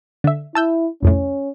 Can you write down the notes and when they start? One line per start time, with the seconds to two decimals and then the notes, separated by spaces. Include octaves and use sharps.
0.24 D3 E5
0.55 E4 A5 E6 G6
1.03 C2 F2 A2 C#4